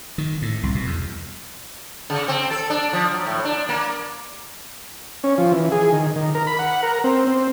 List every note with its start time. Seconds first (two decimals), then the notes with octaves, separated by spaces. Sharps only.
0.18 D#3
0.42 A2
0.63 C2
0.75 B2
0.87 E2
2.10 C#3
2.28 C4
2.51 A4
2.70 D4
2.93 F3
3.11 F#3
3.26 A2
3.45 D4
3.69 A#3
5.24 C#4
5.38 F3
5.52 E3
5.72 G#4
5.92 D#3
6.16 D#3
6.35 A#4
6.47 B5
6.59 F#5
6.83 A#4
7.04 C4
7.27 C4